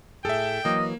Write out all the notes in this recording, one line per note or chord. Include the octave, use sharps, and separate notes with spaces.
A2 G#4 A4 E5 G5
E3 F#3 A#3 D#5